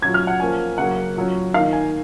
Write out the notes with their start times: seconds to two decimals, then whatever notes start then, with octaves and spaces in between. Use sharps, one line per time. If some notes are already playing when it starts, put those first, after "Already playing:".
0.02 A#2 F#3 C#4 G#6
0.14 F6
0.27 F#5
0.40 F3 A#3 C#4 G#5
0.78 C#3 F#3 A#3 C#4 F#5
1.16 A#2 F#3 C#4
1.54 D#3 A#3 D#4 F5
1.73 G#5